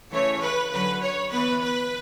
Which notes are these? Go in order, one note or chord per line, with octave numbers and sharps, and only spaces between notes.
C#3 E3 A3 C#4 C#5
B4
D3 F#3 C#4 B4
C#5
E3 B3 B4
B4